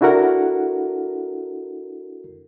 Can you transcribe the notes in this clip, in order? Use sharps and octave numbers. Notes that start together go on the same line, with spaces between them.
D4 E4 F#4 A4 A#4 F#5